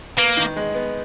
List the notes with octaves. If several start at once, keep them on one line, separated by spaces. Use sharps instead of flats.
A#3 B3
D#3
G#3
B3